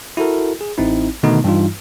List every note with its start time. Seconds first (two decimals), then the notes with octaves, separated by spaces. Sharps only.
0.17 E4 F#4 A4 A#4
0.61 G#4
0.78 A1 C4 D#4 E4
1.23 B2 D3 D#3 A3 B3 D#4
1.44 G2 E3 G3 D#4 F4